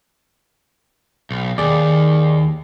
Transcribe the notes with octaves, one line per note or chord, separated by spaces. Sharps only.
B1
D#2 G#4 D5